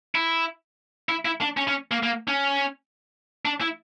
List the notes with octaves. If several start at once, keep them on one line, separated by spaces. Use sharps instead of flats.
E4
E4
E4
D4
C#4
C#4
A#3
A#3
C#4
D4
E4